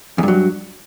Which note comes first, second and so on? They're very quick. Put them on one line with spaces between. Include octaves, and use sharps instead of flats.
E2 G2 F#3